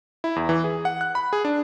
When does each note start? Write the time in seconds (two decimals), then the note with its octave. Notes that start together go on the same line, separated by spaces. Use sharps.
0.24 E4
0.36 E2
0.49 E3
0.64 G#4
0.85 F#5
1.01 F#6
1.15 B5
1.33 G#4
1.45 D4